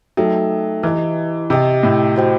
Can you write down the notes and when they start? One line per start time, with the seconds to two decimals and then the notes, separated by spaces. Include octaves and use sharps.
0.17 F#3 A3 D#4 A4 E5 G5
0.83 E3 E4 G4 D#5
1.50 C3 G4 D#5 G5
1.83 A2
2.16 F#4 C5 D#5 G5